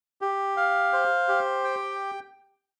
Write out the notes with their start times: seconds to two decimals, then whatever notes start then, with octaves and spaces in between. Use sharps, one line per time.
0.21 G4
0.57 F5
0.93 C5
1.28 G4
1.64 G5